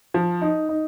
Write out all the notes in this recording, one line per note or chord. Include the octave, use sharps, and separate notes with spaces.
F3
D#4
D#4